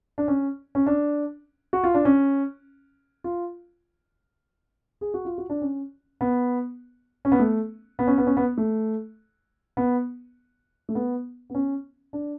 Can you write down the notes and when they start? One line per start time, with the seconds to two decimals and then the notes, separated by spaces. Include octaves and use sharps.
0.18 D4
0.28 C#4
0.75 C#4
0.86 D4
1.73 F#4
1.84 F4
1.94 D4
2.05 C#4
3.24 F4
5.01 G#4
5.14 F#4
5.25 F4
5.38 F#4
5.50 D4
5.62 C#4
6.21 B3
7.25 C#4
7.32 B3
7.40 A3
7.99 B3
8.07 C#4
8.18 B3
8.27 C#4
8.37 B3
8.57 A3
9.77 B3
10.89 A3
10.95 B3
11.50 B3
11.55 C#4
12.13 D4